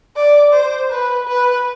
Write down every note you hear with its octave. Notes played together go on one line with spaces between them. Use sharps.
D5
C5
B4
B4